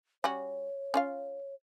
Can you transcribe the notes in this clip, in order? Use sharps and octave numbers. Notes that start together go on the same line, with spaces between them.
G3 C#4 F#4 C#5
C#4 F4 F5